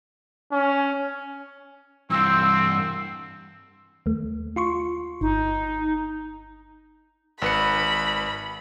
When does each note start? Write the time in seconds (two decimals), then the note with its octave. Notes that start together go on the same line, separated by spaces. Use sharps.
0.52 C#4
2.11 G2 E3 C4 E6
4.06 D#2 A3
4.56 F4 C6 C#6
5.21 G1 D#4
7.42 G#1 B4 B5 C#7